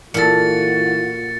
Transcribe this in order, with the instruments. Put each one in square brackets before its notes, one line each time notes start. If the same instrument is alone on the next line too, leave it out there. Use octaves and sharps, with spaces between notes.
[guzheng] A#2 A4 [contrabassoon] E3 [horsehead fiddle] F4 F#4 [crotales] A6 C#7